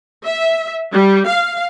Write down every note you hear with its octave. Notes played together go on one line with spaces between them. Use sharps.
E5
G3
F5